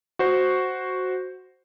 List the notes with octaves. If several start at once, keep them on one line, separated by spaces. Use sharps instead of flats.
F#4 C5